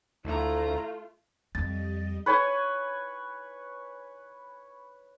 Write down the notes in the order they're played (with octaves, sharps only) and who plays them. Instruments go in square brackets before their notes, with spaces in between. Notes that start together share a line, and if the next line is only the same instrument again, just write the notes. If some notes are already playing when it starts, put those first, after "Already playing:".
[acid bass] D2 [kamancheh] A3 F4 [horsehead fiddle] E4 A#5
[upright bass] F2 [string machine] G3 D#5 [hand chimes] A6
[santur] B4 C#5 G#5